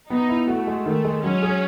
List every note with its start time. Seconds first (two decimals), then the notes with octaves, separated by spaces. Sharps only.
0.10 B3 D#4
0.29 E4
0.48 A3 F#4
0.67 G#3
0.86 D#3 A3
1.04 G#3
1.23 F#3 C#4
1.42 G#4